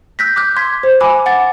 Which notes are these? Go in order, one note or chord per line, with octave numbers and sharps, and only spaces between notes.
E6 F#6 G6 A#6 B6
D6 E6 F#6 G6
C6 G#6 B6
C5
G#5 B5 D6 E6 F#6
F#5 A6